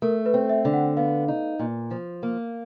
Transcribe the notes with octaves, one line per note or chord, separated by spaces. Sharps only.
A3 A#4
B4
C4
E5
D3
F#5
B3 F5
D#4
A#2
F3
A#3